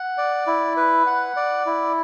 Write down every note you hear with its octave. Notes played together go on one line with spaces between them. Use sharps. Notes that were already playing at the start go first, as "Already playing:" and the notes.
Already playing: F#5
D5
E4
B4
F#5
D5
E4